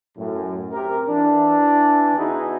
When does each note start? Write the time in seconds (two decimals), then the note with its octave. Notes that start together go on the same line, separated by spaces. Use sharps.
0.17 F#2 A2
0.72 C3 G4 A#4
1.09 E3 D4
2.16 E2 E3 D#4 E4 F#4 G#4